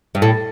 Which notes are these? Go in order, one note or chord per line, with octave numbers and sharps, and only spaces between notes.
G2
A2